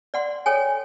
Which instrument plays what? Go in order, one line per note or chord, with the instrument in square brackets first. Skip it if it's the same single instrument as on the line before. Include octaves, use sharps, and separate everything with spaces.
[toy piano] D5 F#5 C6
A4 C#5 G5 G#5